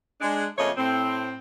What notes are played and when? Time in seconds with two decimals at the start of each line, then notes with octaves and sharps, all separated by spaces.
0.21 G#3 D4
0.58 F2 C#3 A3 A#3 C#5 D#5
0.77 A2 C4